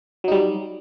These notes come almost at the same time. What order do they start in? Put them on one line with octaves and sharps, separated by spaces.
F#3 D#4 G3